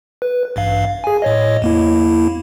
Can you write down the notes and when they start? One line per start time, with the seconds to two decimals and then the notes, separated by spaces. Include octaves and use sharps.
0.22 B4
0.56 A1 G2 F5
1.04 G#4 G#5
1.22 A2 C#5 D#5
1.62 E2 A#3 E4